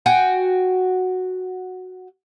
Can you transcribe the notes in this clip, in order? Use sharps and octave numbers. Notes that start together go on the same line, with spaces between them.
F#4 G5 G#5